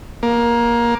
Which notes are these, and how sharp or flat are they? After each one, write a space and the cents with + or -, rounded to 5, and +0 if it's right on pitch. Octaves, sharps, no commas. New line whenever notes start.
A#3 +20